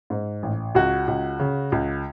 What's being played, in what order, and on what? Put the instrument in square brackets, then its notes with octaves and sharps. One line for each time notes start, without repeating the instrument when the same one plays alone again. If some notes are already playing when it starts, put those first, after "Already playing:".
[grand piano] G#2
A1
C#2 F#4
C#2
C#3
C#2